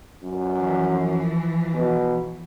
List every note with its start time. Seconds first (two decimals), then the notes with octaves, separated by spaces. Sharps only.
0.23 F#2
0.57 E3 F3
1.74 B2